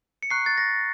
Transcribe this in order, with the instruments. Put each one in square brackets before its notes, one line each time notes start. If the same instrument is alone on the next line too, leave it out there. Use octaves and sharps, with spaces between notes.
[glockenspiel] C#7
A#5 C#6 F#6 C7
A6
A#6